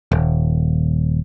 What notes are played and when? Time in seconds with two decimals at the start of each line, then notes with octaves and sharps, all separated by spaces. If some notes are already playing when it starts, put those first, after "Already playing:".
0.12 D#1